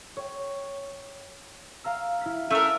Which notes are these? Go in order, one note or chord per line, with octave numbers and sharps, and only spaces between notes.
C#5 G5
F5 A#5 E6
E4 F6 B6
A3 C#4 E4 A#4 E5